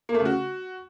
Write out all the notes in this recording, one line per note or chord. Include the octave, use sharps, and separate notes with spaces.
A#3
A3
C#3
F#4